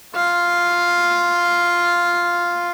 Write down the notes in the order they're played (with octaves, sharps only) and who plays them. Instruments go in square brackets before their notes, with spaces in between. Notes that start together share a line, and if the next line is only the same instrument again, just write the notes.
[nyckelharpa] F4 F5